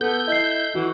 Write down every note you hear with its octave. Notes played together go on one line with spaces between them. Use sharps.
B3 A4 G6
E4 D#5 C7
E3 F#4